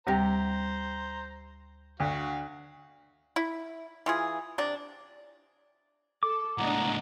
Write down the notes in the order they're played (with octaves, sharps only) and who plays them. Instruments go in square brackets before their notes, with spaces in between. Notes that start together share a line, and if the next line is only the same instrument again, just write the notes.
[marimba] D2 G3 A#6 [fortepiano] C3 G4 [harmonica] C5 A#5
[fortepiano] D2 [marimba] D4 [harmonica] F#4 F5 F#5
[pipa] E4
E3 F4 G#4
C3 D4
[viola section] A4 [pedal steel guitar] D6
[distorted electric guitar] C#2 A2 [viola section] D4 D#5 [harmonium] F#5 A#5